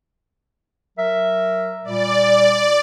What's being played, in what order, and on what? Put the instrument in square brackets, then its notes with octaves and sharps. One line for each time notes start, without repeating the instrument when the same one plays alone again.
[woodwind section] F#3 A#4 E5
[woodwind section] A#2 G3 [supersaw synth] D5